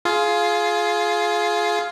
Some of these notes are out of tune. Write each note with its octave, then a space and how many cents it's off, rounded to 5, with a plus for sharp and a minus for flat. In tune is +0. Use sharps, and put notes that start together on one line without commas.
F4 +0 G#4 +20